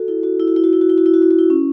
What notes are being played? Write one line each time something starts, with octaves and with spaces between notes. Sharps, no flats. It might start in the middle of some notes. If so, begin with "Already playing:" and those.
Already playing: F#4 A4
E4
F#4
E4
F#4
E4
F#4
E4
F#4
E4
F#4
E4
F#4
E4
F#4
E4
C#4